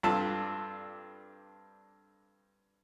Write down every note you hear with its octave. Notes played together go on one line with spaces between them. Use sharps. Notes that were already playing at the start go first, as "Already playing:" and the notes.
G2 C4 D4 F4 A4 A5